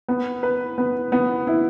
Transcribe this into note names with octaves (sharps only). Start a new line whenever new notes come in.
B3
B4
B3
B3
E4